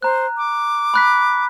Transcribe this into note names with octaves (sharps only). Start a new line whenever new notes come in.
C5 A#5 F#6
D6
B5 F#6 B6